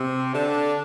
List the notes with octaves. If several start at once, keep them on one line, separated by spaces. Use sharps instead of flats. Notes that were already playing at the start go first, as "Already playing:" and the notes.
Already playing: C3 C4
D3 D4